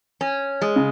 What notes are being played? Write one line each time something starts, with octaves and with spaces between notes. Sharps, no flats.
C#4
G#3
C#3